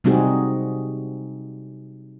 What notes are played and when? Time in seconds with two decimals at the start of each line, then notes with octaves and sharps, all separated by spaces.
0.04 C3 G3 C4 D#4 F#4 G#4